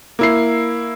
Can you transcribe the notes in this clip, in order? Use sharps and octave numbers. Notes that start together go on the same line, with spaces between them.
A#3 E4 C7